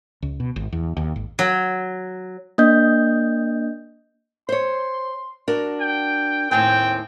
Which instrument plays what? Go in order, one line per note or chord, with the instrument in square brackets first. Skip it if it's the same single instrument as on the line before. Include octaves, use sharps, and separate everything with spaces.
[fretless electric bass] C#2
B2
G#1
E2
D#2
G#1
[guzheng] F#3
[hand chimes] A#3 D4 D#5 G6
[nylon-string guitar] C5 C#5 [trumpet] C6
[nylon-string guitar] D4 F#4 A#4
[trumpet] G5
[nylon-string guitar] D#2 A2 G#5 [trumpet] C4 [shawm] G5